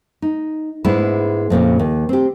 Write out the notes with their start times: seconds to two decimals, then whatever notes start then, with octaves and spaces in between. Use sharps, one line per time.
0.22 D#4
0.85 G#2 G#3 B3 D4 E4
1.50 F2 A#2 C#3 C#4
1.79 D#2
2.09 C4 G4